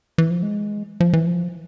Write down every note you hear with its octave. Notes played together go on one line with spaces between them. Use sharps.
E3
F3
G#3
F3
E3
F3